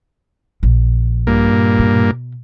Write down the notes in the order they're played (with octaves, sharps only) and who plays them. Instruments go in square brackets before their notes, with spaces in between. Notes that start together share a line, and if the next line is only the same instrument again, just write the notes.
[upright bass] A#1
[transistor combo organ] G2 A#2 A#3
[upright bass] B2